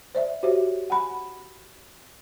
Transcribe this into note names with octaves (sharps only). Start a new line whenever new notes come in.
C5 D5 E5
F#4 G4 C5 C#5 E5
F#5 G#5 B5